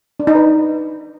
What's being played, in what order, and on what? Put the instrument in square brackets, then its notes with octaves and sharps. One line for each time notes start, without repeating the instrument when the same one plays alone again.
[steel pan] D4
D#4
B4